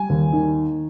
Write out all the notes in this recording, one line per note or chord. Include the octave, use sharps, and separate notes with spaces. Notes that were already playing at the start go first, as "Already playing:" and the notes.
Already playing: G3 G#5
D#2
D#3